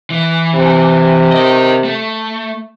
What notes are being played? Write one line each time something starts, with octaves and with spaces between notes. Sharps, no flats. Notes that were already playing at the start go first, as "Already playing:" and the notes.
E3
C3
A#4 D#5
A3